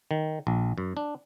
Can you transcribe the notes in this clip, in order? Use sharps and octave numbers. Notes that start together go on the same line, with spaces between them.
D#3
A#1
F#2
D4